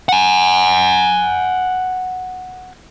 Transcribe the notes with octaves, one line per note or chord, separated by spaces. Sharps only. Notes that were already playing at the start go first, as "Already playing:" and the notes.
F#5 G#5